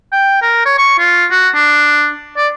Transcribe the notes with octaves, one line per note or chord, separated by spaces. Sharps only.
G5
A#4
C#5
C#6
F4
F#4
D4
D5